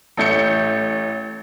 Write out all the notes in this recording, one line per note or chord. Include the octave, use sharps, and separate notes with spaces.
A1 A3 G6 C#7